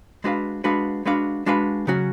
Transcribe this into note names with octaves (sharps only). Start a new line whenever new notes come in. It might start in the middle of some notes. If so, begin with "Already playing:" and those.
G#3 D4 F#4 B4 F5
G#3 D4 F#4 B4 F5
G#3 D4 F#4 B4 F5
G#3 D4 F#4 B4 F5
C#3 F#3 C#4 F#4